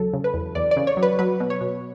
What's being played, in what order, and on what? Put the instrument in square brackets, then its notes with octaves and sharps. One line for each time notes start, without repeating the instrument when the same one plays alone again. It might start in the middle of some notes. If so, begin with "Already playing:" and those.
Already playing: [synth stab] E2 C#3 F#3 A4
C#3
B4
E2
E2 D5
D5
C#3
C#5
F#3
B4
F#3 B4
B2
C#5
B2